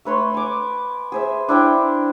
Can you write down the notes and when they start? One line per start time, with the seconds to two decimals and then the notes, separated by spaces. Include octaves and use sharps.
0.05 A3 B4 C#5 C6
0.34 G#5 D6
1.12 G#4 C5 E5
1.49 D4 E4 D5 G5